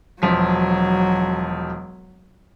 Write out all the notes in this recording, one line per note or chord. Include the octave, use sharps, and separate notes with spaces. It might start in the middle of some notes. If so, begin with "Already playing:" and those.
E1 F3 F#3 B6